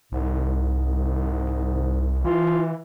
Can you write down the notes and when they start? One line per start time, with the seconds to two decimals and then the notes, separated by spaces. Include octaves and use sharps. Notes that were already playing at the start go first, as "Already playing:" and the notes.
0.12 C2 G#2
2.25 E3 F4